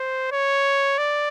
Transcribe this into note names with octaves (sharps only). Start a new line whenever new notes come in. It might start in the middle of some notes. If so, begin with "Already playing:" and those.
Already playing: C5
C#5
D5